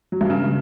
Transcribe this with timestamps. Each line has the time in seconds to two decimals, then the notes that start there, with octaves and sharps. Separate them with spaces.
0.12 F#3
0.21 G2
0.30 C#3